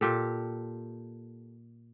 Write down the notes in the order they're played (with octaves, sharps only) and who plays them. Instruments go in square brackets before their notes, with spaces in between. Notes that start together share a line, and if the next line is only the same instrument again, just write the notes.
[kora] A#2 G4 A4